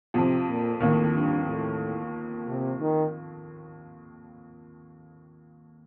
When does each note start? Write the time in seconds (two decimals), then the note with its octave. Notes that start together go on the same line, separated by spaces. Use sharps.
0.14 F2 C3 F3
0.48 A#2
0.80 D#2 A2 D#3
1.14 G2
1.48 A2
2.47 C3
2.80 D#3